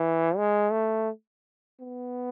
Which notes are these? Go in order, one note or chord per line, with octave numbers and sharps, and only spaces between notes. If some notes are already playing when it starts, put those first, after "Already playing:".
Already playing: E3
G#3
A3
B3